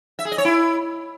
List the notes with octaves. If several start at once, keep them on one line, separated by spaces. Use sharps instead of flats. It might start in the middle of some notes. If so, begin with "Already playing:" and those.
E5
G#4
D#5
C#5
E4